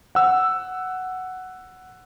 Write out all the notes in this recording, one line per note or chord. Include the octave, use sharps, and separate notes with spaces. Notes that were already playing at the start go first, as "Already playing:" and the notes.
F#5 E6